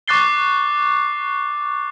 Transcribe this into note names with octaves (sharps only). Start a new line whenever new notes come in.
C#6 D6 F#6 A6 C7 G7